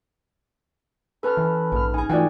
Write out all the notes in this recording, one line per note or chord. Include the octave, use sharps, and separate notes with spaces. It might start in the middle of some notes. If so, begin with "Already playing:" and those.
C#4 A4 B4 A5 B5 F6
E3 B5
A#1 G#2 F6
D#4 G#4 G#5
E3 G#3 A3 F4 F#4 D5 G5